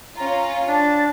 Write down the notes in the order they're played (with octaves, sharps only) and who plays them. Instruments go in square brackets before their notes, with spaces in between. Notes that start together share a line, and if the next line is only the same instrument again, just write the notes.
[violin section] C#4 F4 [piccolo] A#5
[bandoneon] D4 [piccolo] A6